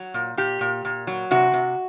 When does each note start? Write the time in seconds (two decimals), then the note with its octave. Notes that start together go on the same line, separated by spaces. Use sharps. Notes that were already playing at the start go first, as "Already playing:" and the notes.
Already playing: F#3
0.14 A#2
0.37 A#2 G4
0.61 A#2
0.85 A#2
1.07 F#3
1.31 C3 F#4
1.54 C3